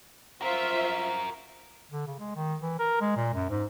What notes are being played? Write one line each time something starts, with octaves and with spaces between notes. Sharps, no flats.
F4 F#4 A#4 C5 E5
D3
C#3
G#3
D#3
E3
A#4
G#3
A#2
F#2
G#2